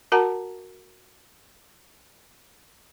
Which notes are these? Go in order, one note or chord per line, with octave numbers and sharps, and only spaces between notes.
F#4 A#4 F#5 A5 A#5